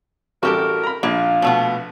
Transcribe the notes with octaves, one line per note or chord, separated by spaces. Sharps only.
A1 G3 F#4 G4 A4 A#4
A#5 B5
A#1 A#3 F4
B2 A3 B3